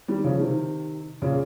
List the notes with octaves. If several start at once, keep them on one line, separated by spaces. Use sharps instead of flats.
D#3 G3
C#3 F3
C3 D#3
A#2 C#3